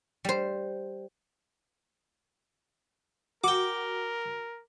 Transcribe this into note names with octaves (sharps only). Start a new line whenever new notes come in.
G3 C5
F#4 A#4 G5 D6